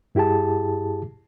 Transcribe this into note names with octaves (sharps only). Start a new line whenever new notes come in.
G2 E4 G4 G#4 A5